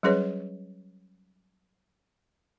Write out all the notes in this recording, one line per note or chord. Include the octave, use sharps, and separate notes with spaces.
F#3 G3 C#4 G#4 B4 C#5